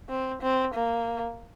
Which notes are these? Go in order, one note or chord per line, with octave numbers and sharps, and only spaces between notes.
C4
C4
A#3